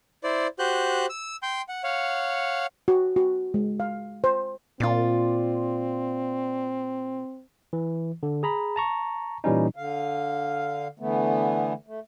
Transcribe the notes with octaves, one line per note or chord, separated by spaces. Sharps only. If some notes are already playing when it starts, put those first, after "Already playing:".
E4 C5 D5
F#4 G4 C5 F#6 G6
E6
G5 C6 G6
F#5
C#5 F5 F#5
F#4
F#4
G#3
F5
C5
A#2 C4 F4 D5
E3
D3
G#4 A#5 B5
A5 A#5 C#6
A#2 E3 G3 C#4 D#4
D3 F5
D3 E3 A3 B3
A3